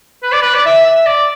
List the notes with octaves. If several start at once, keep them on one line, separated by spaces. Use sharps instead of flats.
B4
D5
B4
D5
E5
E5
D5